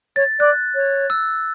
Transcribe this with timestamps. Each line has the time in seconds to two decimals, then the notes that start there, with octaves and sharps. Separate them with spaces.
0.16 C#5 A6
0.39 D5 F#6
0.75 C#5
1.10 E6